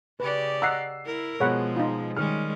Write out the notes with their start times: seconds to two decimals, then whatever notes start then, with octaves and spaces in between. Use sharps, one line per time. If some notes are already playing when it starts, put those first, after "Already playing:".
0.20 C#3 G4 B4 D5
0.62 D#5 F#5 A#5 E6 C7
1.06 E4 A#4
1.40 B2 F3 G#3 G#4 C#5 F#5 B5
1.77 D#4 F4
2.16 D#3 G3 G#3 C#4 F6